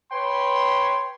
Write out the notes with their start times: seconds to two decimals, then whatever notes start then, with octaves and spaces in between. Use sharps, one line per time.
0.13 B4 C#5 G5 C6